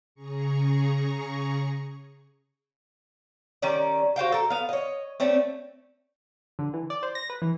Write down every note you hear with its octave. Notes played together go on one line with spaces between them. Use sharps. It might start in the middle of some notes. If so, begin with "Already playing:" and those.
C#3 G#4 A#5 C#6
D#3 G3 C#4 D5
F#4 C5 F5 G5
A4 A#4
B3 F5
C#5 D#5
A3 C4 C#4 D5
D3
E3
D5
C5
A#6
B4
E3